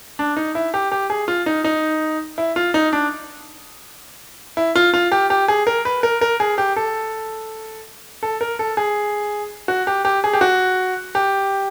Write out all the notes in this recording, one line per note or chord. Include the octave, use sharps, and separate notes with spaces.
D4
D#4
E4
G4
G4
G#4
F4
D#4
D#4
E4
F4
D#4
D4
E4
F4
F4
G4
G4
G#4
A#4
B4
A#4
A#4
G#4
G4
A4
A4
A#4
A4
G#4
F#4
G4
G4
G#4
G4
F#4
G4